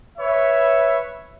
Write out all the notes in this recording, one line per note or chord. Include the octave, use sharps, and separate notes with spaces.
B4 C#5 E5